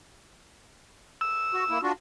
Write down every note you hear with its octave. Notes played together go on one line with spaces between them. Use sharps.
E6
F#4
A#3 E4
D4 F4 F#4